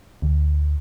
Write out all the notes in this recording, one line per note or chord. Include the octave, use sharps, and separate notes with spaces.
D2